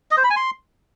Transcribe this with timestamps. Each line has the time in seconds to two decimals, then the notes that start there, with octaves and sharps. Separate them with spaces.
0.11 D#5
0.17 C5
0.24 B5
0.30 G#5
0.36 C6